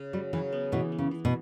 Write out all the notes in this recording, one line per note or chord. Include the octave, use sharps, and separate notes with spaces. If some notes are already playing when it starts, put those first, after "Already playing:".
Already playing: C#3
F#3 G3
C#3 E3
B3
B2 E3
B3
C#3
E3
B2